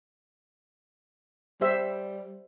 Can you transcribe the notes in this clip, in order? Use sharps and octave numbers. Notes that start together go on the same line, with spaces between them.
G3 G4 C5 E5